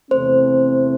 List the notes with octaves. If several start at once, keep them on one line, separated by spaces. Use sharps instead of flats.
E2 C3 E3 A3 C4 C5